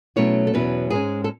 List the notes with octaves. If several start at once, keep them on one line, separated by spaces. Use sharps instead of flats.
B2 F#3 A3 C#4 E4 C#5
A4
E2 B2 F#3 C#4 E4 B4
G#2 G#3 C#4 G#4
A4